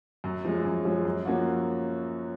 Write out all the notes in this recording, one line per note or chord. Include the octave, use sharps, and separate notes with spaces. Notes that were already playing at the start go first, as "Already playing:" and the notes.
F#2
F3 G#3 C#4
F#2
F3 G#3 C#4
F#2
F3 A#3 C#4 F#4